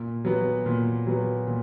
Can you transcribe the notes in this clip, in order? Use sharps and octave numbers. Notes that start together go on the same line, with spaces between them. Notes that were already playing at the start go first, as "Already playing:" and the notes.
Already playing: A#2
F#3 B3
A#2
F#3 B3
A#2